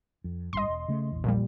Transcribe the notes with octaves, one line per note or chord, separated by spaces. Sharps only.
F2
G#1 G2 G3 D#5 C6
E1
C#3 A3
A#1 E2
A#2 F3 G3